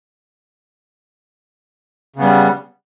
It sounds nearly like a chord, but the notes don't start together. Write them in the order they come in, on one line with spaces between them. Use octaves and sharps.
C#3 B3 G3